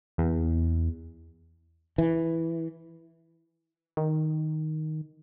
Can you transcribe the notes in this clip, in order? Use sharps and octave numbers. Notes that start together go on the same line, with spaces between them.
E2
E3
D#3